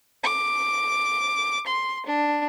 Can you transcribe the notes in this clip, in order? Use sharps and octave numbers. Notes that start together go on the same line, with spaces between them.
D6
C6
D4